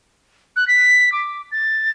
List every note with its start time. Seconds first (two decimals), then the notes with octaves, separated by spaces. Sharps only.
0.56 F#6
0.68 B6
1.12 D6
1.52 A6